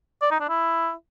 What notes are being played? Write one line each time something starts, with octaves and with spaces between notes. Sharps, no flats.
D5
D#4
D4
E4